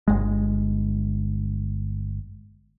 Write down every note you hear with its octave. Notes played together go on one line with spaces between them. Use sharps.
G1 G#3